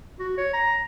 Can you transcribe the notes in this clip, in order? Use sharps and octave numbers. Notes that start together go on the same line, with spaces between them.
F#4
C#5
A#5